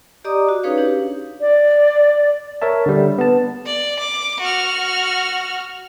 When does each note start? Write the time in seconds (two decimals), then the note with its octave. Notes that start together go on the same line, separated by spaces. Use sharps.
0.25 G4 D5 D#5 A#5 D6 D#6
0.49 F#4
0.63 C#4 D#4 G#4 B4 C#5 F5
0.78 D4 G4
1.41 D5
2.62 A#4 C#5 E5 A5
2.86 D3 G3
3.18 B3 A5
3.66 D5
3.99 D6
4.40 F#4 F6